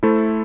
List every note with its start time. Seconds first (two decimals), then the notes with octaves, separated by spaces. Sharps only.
0.03 A3 E4 A4 C5